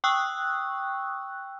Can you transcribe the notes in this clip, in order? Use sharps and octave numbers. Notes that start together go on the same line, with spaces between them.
G5 C#6 D#6 E6 F#6